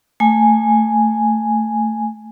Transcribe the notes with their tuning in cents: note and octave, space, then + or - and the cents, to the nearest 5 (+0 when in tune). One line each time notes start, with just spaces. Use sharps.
A3 +20 G#5 +0